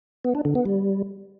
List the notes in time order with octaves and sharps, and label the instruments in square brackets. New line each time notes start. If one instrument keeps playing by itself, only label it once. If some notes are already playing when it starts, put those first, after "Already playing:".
[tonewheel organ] B3
D4
D3
B3
G3